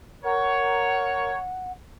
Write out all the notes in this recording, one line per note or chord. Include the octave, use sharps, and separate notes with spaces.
A#4 C#5 F#5